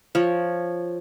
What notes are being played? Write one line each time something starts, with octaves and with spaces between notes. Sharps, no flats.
F3 C#5